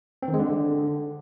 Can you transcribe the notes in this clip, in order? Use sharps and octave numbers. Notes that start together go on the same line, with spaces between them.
C4
D#3
G#3
D3